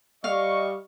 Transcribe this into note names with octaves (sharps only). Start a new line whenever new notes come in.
G3 D#5 F5 C#6